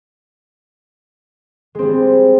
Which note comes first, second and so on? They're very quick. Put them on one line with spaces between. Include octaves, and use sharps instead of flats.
G#3 C4 G3